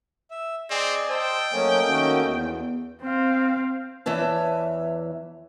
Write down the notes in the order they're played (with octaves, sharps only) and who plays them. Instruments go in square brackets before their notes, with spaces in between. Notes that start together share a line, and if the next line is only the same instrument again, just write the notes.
[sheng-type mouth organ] E5
[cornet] C4 [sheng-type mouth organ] G#4 D5 D#5
[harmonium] C5 [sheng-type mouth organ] D#5 A5 E6 [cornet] G5
[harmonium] F#3 C#4 G#5 [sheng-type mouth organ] A3 A#3 D#5
[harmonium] D#3 C#4 F#4
E2
[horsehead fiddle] C4 F5
[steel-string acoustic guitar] E2 E3 C#5 E5 A5